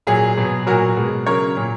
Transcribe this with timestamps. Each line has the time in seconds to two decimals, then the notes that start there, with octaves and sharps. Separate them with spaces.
0.07 A#2 F#3 G#4
0.37 B2 F#3
0.67 A#2 F#3 F#4 A#4
0.97 B2 G#3
1.26 C#3 F#3 A#4 C#5
1.57 A#2 F#3